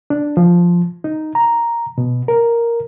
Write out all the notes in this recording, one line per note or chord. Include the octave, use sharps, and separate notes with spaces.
D4
F3
D#4
A#5
B2
A#4